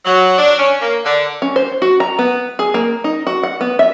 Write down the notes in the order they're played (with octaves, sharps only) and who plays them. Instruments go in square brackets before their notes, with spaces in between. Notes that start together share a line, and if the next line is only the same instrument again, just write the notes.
[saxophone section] F#3
D4
C#4
A#3
D3
[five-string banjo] C#4
C5
F#4
A#5
B3
G#4
A#3
D#4
F#4
F#5
B3
E5